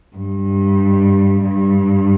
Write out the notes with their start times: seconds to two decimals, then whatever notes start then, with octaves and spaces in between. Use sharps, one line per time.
0.17 G2
1.45 G2